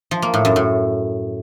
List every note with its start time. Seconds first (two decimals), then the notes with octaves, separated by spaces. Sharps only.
0.11 F3
0.22 A#3
0.34 A2
0.45 F#2
0.56 A2